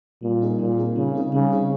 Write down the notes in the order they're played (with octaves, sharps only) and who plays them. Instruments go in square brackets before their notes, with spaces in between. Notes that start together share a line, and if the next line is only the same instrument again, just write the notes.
[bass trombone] A#2 [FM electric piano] G3
[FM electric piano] C4 D#4 G#4
[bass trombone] A#2 [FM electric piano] G3
[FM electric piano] C4 D#4 G#4
[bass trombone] C#3 [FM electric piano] G3
[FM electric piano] C4 D#4 G#4
[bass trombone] C#3 [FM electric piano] G3
[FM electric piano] C4 D#4 G#4